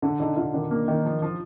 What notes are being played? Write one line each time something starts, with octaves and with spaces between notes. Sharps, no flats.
D3 D4
D3 D#4
D3 F4
D#3 D4
A#3
D#3
F3
F3